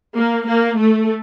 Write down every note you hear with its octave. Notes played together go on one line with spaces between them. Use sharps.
A#3
A#3
A3